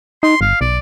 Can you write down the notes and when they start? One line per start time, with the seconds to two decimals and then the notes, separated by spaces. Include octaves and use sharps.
0.23 D#4 C6
0.41 G1 F5
0.61 B1 D5